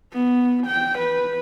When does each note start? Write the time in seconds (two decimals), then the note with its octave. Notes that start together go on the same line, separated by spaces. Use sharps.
0.13 B3
0.67 G5
0.98 B4